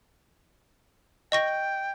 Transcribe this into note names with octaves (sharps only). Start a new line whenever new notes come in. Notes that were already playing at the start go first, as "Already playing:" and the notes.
D#5 G5 C#6 A#6